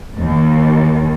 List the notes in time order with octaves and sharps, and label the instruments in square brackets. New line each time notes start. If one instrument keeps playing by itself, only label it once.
[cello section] D#2